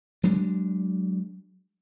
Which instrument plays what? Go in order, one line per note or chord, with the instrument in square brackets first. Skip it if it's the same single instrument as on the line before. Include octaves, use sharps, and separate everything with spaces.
[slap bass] F#3 G#3 D4